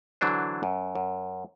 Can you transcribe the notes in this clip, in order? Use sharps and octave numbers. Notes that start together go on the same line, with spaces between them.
D3 E3 F#3 D4 C5
F#2
F#2